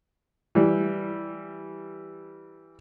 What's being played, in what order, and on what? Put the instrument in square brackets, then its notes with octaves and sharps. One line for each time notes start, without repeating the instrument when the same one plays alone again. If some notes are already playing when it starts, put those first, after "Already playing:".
[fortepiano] E3 G3